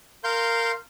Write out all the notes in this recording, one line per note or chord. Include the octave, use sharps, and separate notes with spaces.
A#4 F5 C6 G6